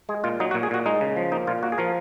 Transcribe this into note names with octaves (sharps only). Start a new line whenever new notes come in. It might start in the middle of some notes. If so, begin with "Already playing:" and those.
G#3 G#4
A#2 F4
F#3 D#4
F#4
A#2
G#4
A#2 F#4
G#3 D#4
C#3
F3
A#3 D#4
A#2 F4
A#3 F#4
G#4
F3 A#4